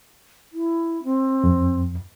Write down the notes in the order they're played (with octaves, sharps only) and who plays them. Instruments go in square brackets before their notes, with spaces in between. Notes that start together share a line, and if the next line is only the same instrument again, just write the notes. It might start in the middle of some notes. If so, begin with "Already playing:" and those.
[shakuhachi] E4
C4
[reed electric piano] F2